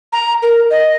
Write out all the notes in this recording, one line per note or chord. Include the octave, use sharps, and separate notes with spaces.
A#5
A#4
D#5